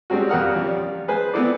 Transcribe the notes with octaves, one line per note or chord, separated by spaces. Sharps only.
G3 G#3 C4 C#4 F#4
F2 G3 A#4 F#5 D#6 F6
F3 G3 C#4
G#4 B4 C5 G#5
B3 C4 E4 A4 D5